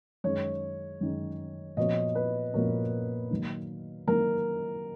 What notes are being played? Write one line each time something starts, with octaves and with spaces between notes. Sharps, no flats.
F#2 D#3 G#3 C#5
F#2 D#3 G#3
A#2 F3 B3 F#4 C#5 D#5
B4
A#2 F3 B3 F#4 A#4 C#5
D#3 F#3 A#3
D#3 F#3 A#3 A#4